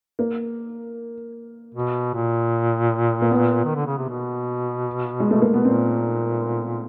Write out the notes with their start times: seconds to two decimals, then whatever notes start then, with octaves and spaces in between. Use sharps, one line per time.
0.19 A#3
1.75 B2
2.14 A#2
3.22 A#3
3.31 B3
3.65 D#3
3.76 D3
3.87 C#3
3.98 C3
4.09 B2
5.20 G#3
5.31 A3
5.42 A#3
5.54 B2 B3
5.65 A#2 C4